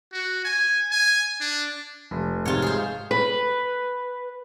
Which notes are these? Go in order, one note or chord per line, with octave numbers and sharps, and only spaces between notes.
F#4
G#5
G#5
D4
F1
G#2 C3 F4 C#5
G#4 C5
B4